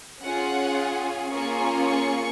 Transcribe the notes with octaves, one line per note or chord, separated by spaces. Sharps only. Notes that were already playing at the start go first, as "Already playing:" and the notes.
C#4 F4 G#4 F#5
A#3 C#4 F4 G#4 C#6
C#6